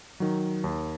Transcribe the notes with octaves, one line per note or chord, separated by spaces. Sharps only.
D#3 F#3
D#2